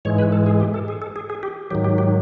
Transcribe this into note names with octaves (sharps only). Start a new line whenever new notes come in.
G#2 E3 G#3 C#5
B4
A4
G#4
G4
A4
G#4
A4
G#4
G#4
G4
G#2 D#3 F#3 G4
G4
G4